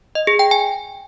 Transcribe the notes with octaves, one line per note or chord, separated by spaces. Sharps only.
D#5
G#4
G5
G#5